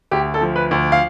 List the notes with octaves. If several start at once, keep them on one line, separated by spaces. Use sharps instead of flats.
D2 G4
A4
F3
B4
D2
F5